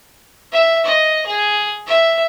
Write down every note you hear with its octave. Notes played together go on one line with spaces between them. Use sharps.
E5
D#5
G#4
E5